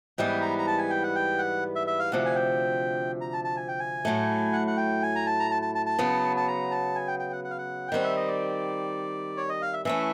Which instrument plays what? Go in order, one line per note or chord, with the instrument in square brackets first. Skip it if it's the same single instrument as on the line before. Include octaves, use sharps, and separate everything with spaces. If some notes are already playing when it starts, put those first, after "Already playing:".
[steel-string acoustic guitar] G#2 E3 G3 B3 [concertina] G5
[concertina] A#5
A#5
A5
G#5
G5
F#5
G5
F#5
E5
E5
F5
[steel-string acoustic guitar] D2 C3 F3 [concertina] F#5
[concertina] G#5
G5
A#5
A5
A5
G#5
G5
G#5
[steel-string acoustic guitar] A2 F#3 A3
[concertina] F#5
F#5
G5
G#5
A#5
A5
A#5
A5
A5
A5
A5
[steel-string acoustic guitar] C#3 F#3 B3
[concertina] A5
A#5
A5
G#5
G5
G5
F#5
F#5
F5
F#5
G5
[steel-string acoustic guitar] D#3 G3 C4 [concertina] F#5
[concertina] E5
D#5
D5
C#5
D#5
F5
E5
[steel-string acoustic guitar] E3 A3 C#4 [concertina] E5